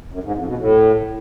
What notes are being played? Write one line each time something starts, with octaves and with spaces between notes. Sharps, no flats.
F#2
G#2
F2
B2
A2